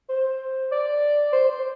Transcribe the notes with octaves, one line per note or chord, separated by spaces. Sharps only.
C5
D5
C5
C5